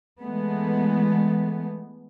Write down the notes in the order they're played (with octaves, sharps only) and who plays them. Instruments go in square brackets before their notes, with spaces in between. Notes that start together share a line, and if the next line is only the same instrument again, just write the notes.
[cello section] E3 G#3 A3 B3